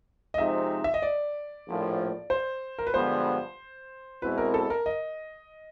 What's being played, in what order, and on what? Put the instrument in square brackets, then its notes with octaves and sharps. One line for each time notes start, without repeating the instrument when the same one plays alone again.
[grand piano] D#5
[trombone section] C3 F3 G#3 C4 D#4 [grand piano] E5
[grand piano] E5
D#5
D5
[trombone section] A#1 A2 F3 A#3
[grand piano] C5
A#4
B4
[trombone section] G2 D3 F3 G#3 B3 [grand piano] C5
[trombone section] B2 G#3 C4 E4 [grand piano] B4
[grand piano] A#4
A4
A#4
D#5